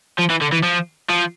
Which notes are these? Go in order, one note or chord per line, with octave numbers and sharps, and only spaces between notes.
F3
E3
D3
E3
F3
F3